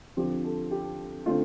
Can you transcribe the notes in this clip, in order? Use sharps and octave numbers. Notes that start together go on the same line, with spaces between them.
D3 F3 C4 G4
A4
G4
D3 A3 C4 F4